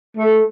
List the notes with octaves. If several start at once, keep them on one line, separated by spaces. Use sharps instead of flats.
A3